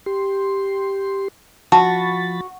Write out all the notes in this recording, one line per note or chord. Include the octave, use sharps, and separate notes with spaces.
G4 C6
F3 F#4 A5 B5 A6